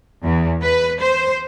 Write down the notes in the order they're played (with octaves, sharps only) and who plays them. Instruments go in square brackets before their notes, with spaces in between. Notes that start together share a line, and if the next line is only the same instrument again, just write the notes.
[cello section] E2
B4
C5